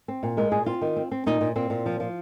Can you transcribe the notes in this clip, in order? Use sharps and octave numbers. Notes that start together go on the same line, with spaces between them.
C4
A#2
G#3 A#4
A#2 G#4
C4 F4
D#3
C4
C4
A#2 D#4
A#2
A#2 C4
A#2
F3
F3